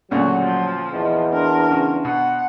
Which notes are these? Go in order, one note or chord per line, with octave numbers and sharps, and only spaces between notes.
D2 A#2 C#3 F#3 F#4
F3
E2 D#5 A#5
D4 A#4 C5
C#3
B2 F#5